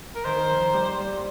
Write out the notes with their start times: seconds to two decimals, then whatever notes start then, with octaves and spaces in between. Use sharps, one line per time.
0.15 A#4
0.25 D#3 C5
0.50 F3
0.73 G3
0.99 G3